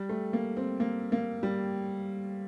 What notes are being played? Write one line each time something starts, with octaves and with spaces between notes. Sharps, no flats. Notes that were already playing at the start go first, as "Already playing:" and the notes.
Already playing: G3
A3
A#3
C4
A#3
A#3
G3